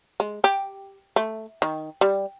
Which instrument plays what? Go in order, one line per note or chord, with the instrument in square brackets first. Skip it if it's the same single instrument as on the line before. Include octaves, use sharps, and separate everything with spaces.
[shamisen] G#3
G4
A3
D#3
G3